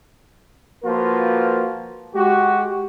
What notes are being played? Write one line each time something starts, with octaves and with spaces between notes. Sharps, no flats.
F3 A#3 F4 F#4 A#4 B4
G#3 F#4 G4